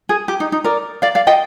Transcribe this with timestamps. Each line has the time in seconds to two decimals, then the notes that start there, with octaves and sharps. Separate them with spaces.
0.09 G#4
0.28 G4
0.40 D#4
0.52 D#4
0.64 A#4 D5
1.02 D5 F5
1.15 D5 F5
1.27 D#5 G5